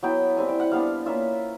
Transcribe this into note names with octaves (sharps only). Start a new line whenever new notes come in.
F#3 B3 E4 G5
G3 C4 E4 G#5
G5
F#5
G3 B3 D4 F5
A#3 C#4 F4 E5